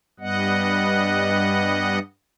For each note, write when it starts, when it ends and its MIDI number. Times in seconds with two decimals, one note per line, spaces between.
0.20 1.99 43
0.20 1.99 55
0.20 1.99 59
0.20 1.99 75
0.20 1.99 78